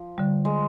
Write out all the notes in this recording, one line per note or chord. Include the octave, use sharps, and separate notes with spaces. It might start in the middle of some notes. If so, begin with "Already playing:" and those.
Already playing: F3
D3 G3
G#3